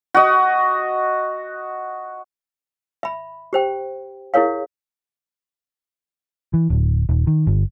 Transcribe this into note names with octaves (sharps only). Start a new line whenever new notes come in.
F#4 D#5
E5 B5
G4 C5 G5
E4 G#4 A#4 C#5 F5
E3
D1
D#1
D#3
G1